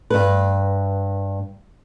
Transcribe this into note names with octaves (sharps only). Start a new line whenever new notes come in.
G2 B4